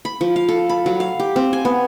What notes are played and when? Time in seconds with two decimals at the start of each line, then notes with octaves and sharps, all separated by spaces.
0.05 B5
0.21 F3
0.36 F5
0.49 A4
0.69 B5
0.86 F#3
1.00 F5
1.20 G4
1.36 C4
1.53 G#5
1.65 B3